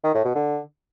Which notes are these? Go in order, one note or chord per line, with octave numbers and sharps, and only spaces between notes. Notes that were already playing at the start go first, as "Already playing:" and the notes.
D#3
A2
B2
D3